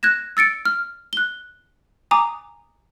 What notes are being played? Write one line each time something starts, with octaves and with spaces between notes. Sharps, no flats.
F#6 G#6 A#6 E7
E6 A6 C#7 D7
F6
F#6 G7
G#5 A#5 D6 D#6